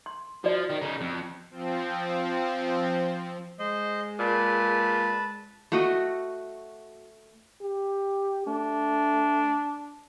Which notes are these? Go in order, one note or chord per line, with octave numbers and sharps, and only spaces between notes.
C6
F3 F#4 D5
D#3
C#3 D#4
F2
F3 C4
G#3 C5 D#5
A#2 B4 A5
A3 F#4 D#5
G4
A3 D4